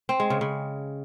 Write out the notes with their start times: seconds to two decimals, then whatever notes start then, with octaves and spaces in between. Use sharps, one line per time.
0.09 C4
0.20 G#3
0.30 C#3
0.41 C#3